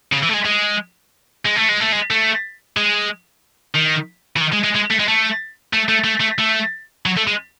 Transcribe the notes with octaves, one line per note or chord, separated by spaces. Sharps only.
C#3
E3
A3
G#3
G#3
G#3
A3
G#3
A3
G#3
A3
G#3
D#3
E3
D#3
G#3
G#3
G#3
A3
G#3
A3
A3
A3
A3
A3
A3
F#3
A3
G#3